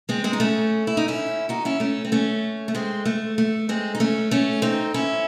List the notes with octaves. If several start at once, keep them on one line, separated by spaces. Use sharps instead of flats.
G#3 C4
G#3 C4
D#4
A3 C#4
E4
D#4
C#4 E4
D#4 F#4
C#4 E4
A3 C#4
C4
A3 C#4
A3
G#3 C4
A3
A3
G#3 C4
D#4
A3 C#4
A3 C#4
C4 D#4
C#4 E4